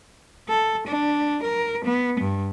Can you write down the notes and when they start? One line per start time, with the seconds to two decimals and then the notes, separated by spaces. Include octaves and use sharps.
0.49 A4
0.87 D4
1.43 A#4
1.84 B3
2.20 G2